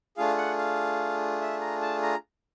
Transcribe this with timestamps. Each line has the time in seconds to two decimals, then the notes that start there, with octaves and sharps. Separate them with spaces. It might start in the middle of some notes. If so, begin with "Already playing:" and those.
0.17 A3 D4 F4 G#4 F5
0.38 F#5
0.58 F5
1.41 E5
1.61 A#5
1.82 A5
2.03 A#5